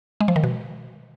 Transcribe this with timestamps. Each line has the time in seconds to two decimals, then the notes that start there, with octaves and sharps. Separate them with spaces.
0.21 G#3
0.28 F3
0.36 D#3
0.44 B2